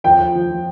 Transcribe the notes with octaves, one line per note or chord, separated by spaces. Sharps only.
F2 G5
F2
F3
F3